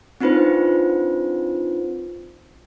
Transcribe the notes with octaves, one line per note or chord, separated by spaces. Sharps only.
C4 D4 D#4 F4 B4 C5